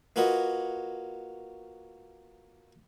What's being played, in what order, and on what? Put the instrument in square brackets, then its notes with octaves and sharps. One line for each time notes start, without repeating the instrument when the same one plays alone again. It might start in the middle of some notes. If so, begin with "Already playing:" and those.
[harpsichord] A#3 F4 F#4 B4 C#5 D#5